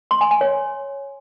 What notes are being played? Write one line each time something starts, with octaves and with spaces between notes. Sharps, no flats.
C6
G#5
G#5
C#5